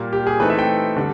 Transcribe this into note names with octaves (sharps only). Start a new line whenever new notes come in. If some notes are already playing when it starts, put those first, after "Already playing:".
Already playing: A#2 G3 A#3
G4
G#4
E3 A3 C4 D#4 B4
E5
G5
D3 G3